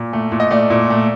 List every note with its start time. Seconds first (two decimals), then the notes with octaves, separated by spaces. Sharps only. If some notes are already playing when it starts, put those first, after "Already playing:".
Already playing: A#2
0.13 A3
0.32 A#2
0.40 D#5
0.51 A3 D5
0.70 A#2
0.90 A3